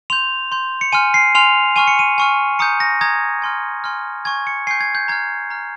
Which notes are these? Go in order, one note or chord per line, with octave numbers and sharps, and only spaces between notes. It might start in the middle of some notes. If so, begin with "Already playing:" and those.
C6 G6 F7
C6 G6
C#7
G#5 C6 F6 D#7
C7
G#5 C6 F6 F7
G#5 C#6 F6 D#7
C#7
D#7
G#5 C#6 F6
A#5 D#6 G6 C#7
A#6
A#5 D#6 G6 G#6
G#5 C6 F6
G#5 C6 F6
G#5 C#6 G6 G#6
C#7
G#5 C#6 G6 C7
G#6
G6
A#5 F6 G#6
A#5 F6